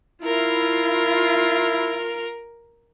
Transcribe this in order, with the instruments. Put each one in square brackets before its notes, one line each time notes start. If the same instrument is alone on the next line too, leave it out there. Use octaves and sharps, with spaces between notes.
[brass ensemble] E4 [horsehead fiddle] F4 [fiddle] A#4